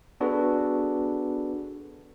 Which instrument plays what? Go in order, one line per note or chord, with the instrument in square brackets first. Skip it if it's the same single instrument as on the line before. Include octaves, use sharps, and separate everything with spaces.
[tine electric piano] B3 D4 F#4 G#4 A4 B4